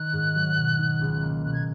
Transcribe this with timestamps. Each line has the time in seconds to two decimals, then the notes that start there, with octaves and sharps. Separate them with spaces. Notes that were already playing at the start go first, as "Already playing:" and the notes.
Already playing: D#3 F#6
0.13 G#2
0.36 F#3
0.57 B2
0.79 D#4
1.01 C#2
1.23 A#3
1.45 B2 F#6
1.53 G#6